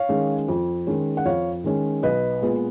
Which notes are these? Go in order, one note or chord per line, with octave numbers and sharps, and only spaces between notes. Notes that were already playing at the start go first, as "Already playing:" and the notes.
Already playing: C#5 F5
D#3 G#3 C#4
F2
D#3 G#3 C#4
F#5
F2 C#5 F5
D#3 G#3 C#4
B1 B4 D#5
A#2 G#3 B3